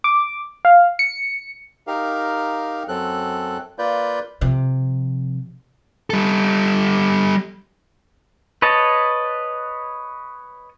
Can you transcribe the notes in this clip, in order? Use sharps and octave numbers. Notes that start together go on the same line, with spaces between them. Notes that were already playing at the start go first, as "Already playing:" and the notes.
D6
F5
C#7
D#4 G4 A#4 F5
F#2 F#3 C4 A4 F#6
A#3 F4 B4 D5 G6
C3 F3
G3 A4
B4 C#5 D#5 A5